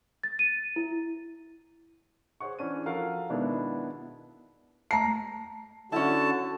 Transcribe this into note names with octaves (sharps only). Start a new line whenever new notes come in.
A6
D#7
E4
G#4 C5 C#5 F#5 C#6
E3 C#4 D4 D#7
F3 F#4 A4 A#4 F5 F#5
B2 D#3 G#3 B3 D4 E4
A3 A5 A#5 C7
D3 C#4 E4 F#4 A5